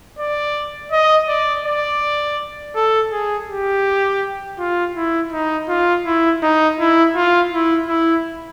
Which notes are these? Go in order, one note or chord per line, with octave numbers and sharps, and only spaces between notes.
D5
D#5
D5
D5
A4
G#4
G4
F4
E4
D#4
F4
E4
D#4
E4
F4
E4
E4